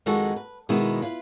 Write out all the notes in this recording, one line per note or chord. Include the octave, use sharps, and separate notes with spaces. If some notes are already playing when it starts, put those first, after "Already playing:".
F2 D#3 G#3 D#4 F#4 A4
B4
B2 D#3 G#3 B3 E4
E4 F4 B4